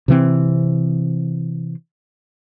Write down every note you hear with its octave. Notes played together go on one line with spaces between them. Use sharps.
C3 E3 C4